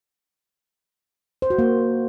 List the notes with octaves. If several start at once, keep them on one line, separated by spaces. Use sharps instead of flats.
C5
F#4
A#3